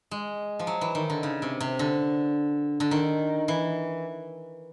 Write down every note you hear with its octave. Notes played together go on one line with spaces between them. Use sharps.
G#3
F3
F#3
E3
D#3
D3
C#3
C3
C3
D3
D3
D#3
E3